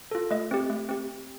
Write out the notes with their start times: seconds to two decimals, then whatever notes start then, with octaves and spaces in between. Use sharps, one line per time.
0.11 F4 A4
0.31 A3 D#5
0.51 C4 G4
0.69 A3
0.89 C4 G4